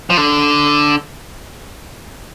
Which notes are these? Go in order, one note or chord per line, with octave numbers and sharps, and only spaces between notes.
F3
D3